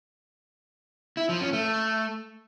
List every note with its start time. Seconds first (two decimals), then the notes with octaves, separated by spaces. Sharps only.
1.17 E4
1.29 F3
1.41 C#4
1.53 A3